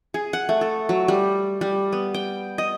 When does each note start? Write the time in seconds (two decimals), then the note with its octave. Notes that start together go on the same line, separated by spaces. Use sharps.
0.14 G#4
0.33 F#5
0.49 A3
0.61 A4
0.89 F#3
1.08 G3
1.61 G3
1.92 B3
2.14 G5
2.58 D#5